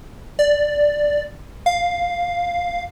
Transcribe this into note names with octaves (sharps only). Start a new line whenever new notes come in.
D5
F5